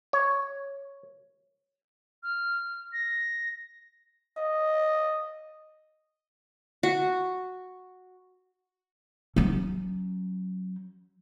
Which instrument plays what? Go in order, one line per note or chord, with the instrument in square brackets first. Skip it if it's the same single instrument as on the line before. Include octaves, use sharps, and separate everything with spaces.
[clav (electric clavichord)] C#5
[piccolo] F6
A#6
[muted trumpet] D#5
[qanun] F#4
[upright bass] F#3 C#4